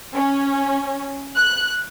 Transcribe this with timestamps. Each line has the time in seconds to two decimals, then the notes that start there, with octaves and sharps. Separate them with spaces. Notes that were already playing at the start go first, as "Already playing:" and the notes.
0.15 C#4
1.36 F#6